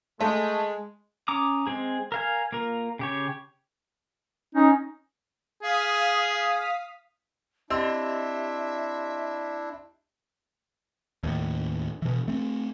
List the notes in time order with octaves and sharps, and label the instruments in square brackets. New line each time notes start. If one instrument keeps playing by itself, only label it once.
[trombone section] G#3 [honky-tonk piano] A3
[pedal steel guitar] C#4 A#5 D6 D#6
G#3 C4 G#4
A#4 F5 G#5
A#3 F4 A#4
C#3 G4 C#5
[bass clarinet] C#4 [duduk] D#4
[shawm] G#4 [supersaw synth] F5 D#6 B6
[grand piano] C4 C6 E6 [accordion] D4 E4 [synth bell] G4 D#5 [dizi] E5
[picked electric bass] D#2 A2
B2 E3
A3 C4